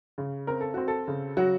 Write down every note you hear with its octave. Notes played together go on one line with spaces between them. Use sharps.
C#3
C4 A#4
A4
C4 F#4
A4
C#3
F#3 F#4